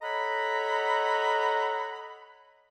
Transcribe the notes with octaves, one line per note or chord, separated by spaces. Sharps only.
A4 C#5 D#5 F#5 A#5 B5